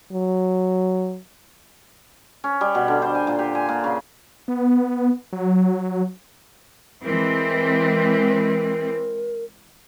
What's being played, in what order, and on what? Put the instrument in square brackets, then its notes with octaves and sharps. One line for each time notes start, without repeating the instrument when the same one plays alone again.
[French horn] F#3
[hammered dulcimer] C#4
G3
B2
D3
C5
G#5
A#2
G4
G#5
A#2
C#3
[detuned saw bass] B3
F#3
[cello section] E3 G#3 C4 [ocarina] A#4